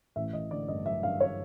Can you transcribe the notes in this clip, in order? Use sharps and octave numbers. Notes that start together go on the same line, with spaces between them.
A1 E5
A1 D#5
D3 D5
G2 D#5
F#3 E5
G2 F5
C#5